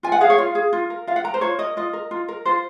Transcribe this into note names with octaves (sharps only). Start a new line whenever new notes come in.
F4 G#5
F#5
G#4 F5
C#5
F4 F5
G#4
F4
A#4
F4 F5
F#5
A#4 A#5
C5
F4 C#5
A#4 D#5
F4 D#5
A#4
F4
A#4
F4 C5